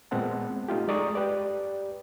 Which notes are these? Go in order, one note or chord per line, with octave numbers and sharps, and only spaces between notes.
A#2 G#3 B3 C4 F#5 A5
A3 D#4 F4 G4
G#3 A4 D5 A#5 C#6 D#6
G4 B4 D5